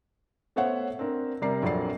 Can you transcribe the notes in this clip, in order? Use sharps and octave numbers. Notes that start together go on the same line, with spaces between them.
A3 B3 C5 C#5 E5 F#5
C4 D4 A#4
C3 G3 A#4 D5 A#5 C7
A#1 F2 F#3 A#4 D5 C7